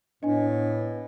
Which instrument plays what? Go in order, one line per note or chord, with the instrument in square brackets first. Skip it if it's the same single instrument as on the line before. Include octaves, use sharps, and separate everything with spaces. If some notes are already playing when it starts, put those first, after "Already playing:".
[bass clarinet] A2 [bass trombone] B3 [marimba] D4 [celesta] D#5 G#5